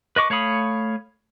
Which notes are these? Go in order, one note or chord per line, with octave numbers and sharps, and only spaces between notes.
B4 D#5 C#6 D6
A3 C#5 F5 B5 D#6